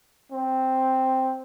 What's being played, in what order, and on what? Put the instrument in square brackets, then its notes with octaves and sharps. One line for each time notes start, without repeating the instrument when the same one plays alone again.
[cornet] C4